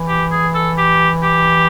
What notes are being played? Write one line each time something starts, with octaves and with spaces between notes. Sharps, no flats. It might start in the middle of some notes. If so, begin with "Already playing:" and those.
Already playing: E3
G4
G#4
A4
G4
G4